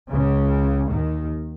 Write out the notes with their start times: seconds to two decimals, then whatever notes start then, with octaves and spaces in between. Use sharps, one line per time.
0.10 C#2 C#3
0.90 D#2 D#3